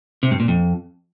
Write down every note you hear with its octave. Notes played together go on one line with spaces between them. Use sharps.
C3
G2
A#2
F2